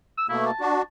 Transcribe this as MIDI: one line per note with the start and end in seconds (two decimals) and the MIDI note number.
0.17 0.28 88
0.29 0.51 47
0.29 0.51 57
0.29 0.51 58
0.29 0.45 64
0.46 0.82 81
0.60 0.82 62
0.60 0.82 66